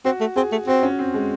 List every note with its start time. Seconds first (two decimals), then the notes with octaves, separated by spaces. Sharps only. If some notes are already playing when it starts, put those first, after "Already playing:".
0.05 C4 F#4
0.21 A3
0.36 C4 G#4
0.52 A3
0.68 C4 F#4
0.83 C#4
0.99 C4
1.14 G#3